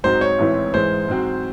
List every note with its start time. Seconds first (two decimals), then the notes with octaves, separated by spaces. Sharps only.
0.04 G#2 F#3 C4 D#4 F#4 C5
0.21 C#5
0.39 A1 G#2 E3 C4 E4
0.74 G#2 E3 G#3 C5
1.08 G#2 F#3 C4 F#4